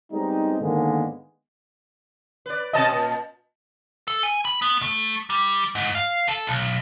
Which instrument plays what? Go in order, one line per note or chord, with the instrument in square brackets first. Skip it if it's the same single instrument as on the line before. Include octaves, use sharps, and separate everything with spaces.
[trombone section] G3 G#3 B3 C4 D#4
G#2 D3 D#3 G#3 A#3 B3
[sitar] B4 D5
[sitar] B2 C4 C#4 [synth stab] D#5 A5
[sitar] A#2
[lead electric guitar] A4
G#5
B5
B3
A3
G3
G#2
F5
A4
B1